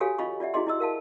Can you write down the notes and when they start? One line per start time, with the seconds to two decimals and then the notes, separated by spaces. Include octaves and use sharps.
0.01 F#4 G4 A4 C#5 F5 G#5
0.18 F4 D#5 F5 B5 C#6
0.40 F4 D5 E5 F#5
0.54 E4 F#4 G#4 D#5 C6
0.67 E4 D#5 E6
0.80 A#4 F5 A5